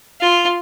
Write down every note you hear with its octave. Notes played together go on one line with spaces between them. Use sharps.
F4